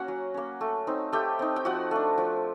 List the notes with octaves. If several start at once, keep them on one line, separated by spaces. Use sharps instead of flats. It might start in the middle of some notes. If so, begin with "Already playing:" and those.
Already playing: A#3 C#4 F#4 F#5
F#3
A#3 C#4
A3
C4 D#4
A3 G4 G5
C4 D#4
G5
F3 F#4 F#5
A3 D4
F3